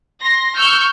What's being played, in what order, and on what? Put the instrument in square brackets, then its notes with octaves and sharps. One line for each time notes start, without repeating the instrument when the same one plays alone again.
[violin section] C6 A#6
C#6 E6 F6 G6